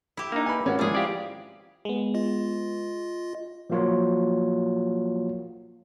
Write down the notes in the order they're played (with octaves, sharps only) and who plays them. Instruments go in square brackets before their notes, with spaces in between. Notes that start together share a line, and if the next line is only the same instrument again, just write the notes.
[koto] E4 G4
[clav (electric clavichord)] A#3 D#4 [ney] D4
[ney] B4 [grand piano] G#5 B5
[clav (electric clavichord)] G#1 [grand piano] C#4 [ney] F#5
[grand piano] F3 G#3 E4 [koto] G3 G#4 [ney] C4
[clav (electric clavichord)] G4 D5 [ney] F5
[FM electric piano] G#3 B3
[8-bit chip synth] F4 D#5
[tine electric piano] F3 F#3 A#3 F4 F#4 C#5